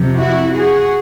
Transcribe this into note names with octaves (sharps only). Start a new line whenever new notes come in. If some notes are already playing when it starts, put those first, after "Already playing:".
Already playing: F2 C3 F3
E4 F#4
F#4 G#4